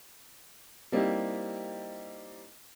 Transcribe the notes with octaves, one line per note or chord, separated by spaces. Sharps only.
G3 A#3 C4 D#4 E4 G4